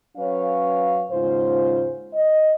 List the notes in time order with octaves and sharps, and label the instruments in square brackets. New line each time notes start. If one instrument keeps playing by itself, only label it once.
[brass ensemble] F#3 C#4 B4 C#5 F5
D#2 G#2 C#3 F4 C5
D#5